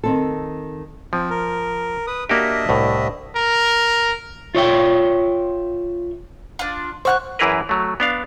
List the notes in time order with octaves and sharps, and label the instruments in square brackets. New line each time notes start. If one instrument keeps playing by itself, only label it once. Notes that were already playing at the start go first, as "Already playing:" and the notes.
[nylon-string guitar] D#3 C4 A4
[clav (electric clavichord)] F3 [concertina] C4
[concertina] A#4
B4 D#6
[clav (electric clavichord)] A#3 F#4 G4 [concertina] D4 D#5 E5
[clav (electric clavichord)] C2 A2
[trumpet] A#4
[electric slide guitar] F4 C#5 E5 G5
[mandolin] D4 F4
[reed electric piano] C5 F#5 [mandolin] C#6 F6 F#6
[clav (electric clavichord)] F#2 E3 E4 G#4 A#4 B4
F#3 A3
B3 D4 F5